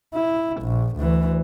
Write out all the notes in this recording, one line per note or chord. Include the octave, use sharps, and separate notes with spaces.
E4
A#1
D2 E3